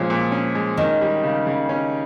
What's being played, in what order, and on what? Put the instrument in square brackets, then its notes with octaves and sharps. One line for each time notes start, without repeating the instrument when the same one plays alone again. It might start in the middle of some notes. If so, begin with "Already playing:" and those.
Already playing: [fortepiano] A#2 G#3 C#4 [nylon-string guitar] F3
[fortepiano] A#2
C#4
G#3
[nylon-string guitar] D#3 [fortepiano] C#4
[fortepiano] G3
C#3
C#3
C#4